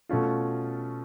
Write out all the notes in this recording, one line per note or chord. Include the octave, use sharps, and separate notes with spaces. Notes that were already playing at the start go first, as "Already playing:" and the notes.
B2 A3 C#4 F4